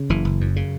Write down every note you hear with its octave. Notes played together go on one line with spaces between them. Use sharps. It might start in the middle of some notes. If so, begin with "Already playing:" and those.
Already playing: C#3
F#1 E3
F#1
F#2
C#3